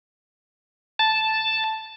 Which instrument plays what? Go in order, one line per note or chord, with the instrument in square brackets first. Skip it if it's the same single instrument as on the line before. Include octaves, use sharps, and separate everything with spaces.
[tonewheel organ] A5